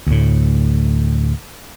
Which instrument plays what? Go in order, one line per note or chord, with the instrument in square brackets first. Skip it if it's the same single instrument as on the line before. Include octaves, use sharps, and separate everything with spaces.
[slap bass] D2 A2